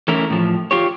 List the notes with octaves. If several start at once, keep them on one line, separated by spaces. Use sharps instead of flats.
E3 A3 C#4 E4 A#4
A2 F3
F4 G4 C#5